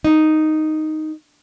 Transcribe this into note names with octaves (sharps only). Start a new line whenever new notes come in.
D#4